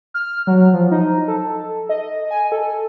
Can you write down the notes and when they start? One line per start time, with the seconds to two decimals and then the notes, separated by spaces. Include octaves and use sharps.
0.14 F6
0.47 F#3
0.73 F3
0.91 D#4
1.28 A4
1.89 D#5
2.31 G#5
2.52 A4